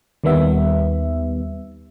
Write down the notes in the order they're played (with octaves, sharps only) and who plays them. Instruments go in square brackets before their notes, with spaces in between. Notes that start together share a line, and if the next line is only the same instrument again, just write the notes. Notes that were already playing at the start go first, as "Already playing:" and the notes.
[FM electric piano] D#2 D#3 G3 B3 E5